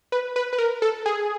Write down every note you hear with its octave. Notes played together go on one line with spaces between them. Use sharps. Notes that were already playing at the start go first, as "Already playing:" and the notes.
B4
B4
B4
A#4
A4
G#4